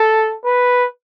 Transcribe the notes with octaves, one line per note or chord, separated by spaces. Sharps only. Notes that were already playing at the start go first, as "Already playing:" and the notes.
Already playing: A4
B4